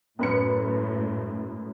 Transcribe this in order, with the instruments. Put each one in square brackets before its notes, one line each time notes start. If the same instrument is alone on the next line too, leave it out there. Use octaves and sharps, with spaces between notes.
[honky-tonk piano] F#2 B4 C#7 [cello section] A2